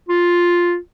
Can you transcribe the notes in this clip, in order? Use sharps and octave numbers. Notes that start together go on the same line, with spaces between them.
F4